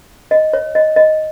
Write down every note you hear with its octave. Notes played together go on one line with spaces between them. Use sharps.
D#5
C#5
D#5
D#5